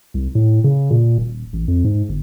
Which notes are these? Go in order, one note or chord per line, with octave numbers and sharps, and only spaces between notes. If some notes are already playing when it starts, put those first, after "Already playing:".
C2
A2
C#3
A#2
D#1
A1
F2
G#2
G1